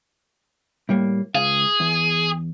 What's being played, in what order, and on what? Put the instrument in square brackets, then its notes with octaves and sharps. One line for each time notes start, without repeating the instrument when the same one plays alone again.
[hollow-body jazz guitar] A2 G3 A#3
[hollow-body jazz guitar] C#2 F5 [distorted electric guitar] G#4
[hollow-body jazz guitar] E2